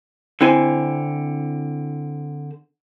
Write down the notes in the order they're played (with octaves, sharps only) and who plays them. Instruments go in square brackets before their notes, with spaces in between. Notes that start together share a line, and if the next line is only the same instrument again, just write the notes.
[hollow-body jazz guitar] D3 C4 E4 C5 G#5